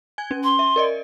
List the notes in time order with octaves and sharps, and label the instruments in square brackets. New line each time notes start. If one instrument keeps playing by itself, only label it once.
[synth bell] G#5 G#6
C#4
[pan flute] C6
[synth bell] E5
A#4 D5 D#5